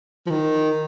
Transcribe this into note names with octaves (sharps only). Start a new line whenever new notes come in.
F3
D#3